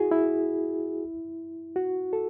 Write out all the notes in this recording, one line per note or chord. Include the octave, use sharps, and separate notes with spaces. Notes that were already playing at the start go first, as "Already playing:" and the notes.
Already playing: E4 F#4 G#4
E4
F#4
A4